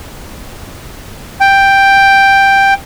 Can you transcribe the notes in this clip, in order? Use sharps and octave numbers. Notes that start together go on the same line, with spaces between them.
G5